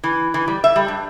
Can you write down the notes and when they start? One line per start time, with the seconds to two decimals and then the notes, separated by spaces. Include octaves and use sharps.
0.04 E3
0.34 E3
0.48 G3
0.64 E5
0.76 G3
0.88 G2